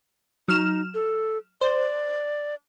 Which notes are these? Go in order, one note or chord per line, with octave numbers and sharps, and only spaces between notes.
F#3 D#4 F6 E7
A4
C5 D5